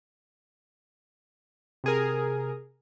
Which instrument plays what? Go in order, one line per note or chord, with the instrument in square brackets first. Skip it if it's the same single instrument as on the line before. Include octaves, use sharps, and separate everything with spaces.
[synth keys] C3 G#4 A#4